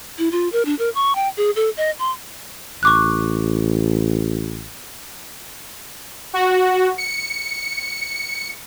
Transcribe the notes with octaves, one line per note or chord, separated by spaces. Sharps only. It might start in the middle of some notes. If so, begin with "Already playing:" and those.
E4
F4
A#4
D4
A#4
C#6
G5
G#4
A4
D#5
C6
A1 C#6 D6 F#6
F#4
C#7